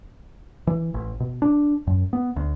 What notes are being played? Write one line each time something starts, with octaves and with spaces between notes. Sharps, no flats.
E3
A1
B2
D4
F#2
B3
D2